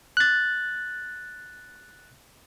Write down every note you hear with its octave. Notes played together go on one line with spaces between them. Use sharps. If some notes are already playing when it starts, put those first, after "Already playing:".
F#6 A6